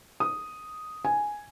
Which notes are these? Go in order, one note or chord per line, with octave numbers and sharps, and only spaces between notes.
D#6
G#5